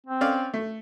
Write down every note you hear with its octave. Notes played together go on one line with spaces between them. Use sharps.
C4
C#4 D5 F5
A3